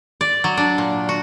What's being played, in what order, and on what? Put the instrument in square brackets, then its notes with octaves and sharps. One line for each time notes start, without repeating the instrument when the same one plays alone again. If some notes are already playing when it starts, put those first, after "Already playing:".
[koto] D5
F#3
D4
A#2
F#4